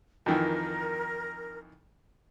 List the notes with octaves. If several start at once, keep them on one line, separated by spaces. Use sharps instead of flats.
F2 D#3 E3 A#4